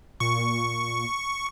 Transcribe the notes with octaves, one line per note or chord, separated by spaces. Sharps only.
A#2 C#6